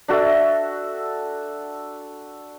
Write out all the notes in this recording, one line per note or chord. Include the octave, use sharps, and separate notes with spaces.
D4 F#4 A4 E5